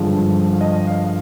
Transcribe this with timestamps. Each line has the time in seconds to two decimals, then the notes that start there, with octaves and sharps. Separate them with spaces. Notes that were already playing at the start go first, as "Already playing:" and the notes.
Already playing: G2 D3 F3 G#3
0.52 F5
0.61 D#5
0.87 F5